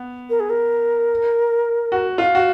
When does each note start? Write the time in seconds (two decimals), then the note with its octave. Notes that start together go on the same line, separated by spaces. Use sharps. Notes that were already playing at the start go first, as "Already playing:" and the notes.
Already playing: B3
0.30 A#4
0.40 G#4
0.50 A#4
1.92 F#4
2.18 F4
2.35 F#4